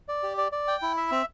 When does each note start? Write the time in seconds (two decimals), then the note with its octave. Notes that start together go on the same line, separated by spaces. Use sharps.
0.08 D5
0.23 G4
0.38 D5
0.52 D5
0.68 G5
0.82 E4
0.97 E5
1.11 C4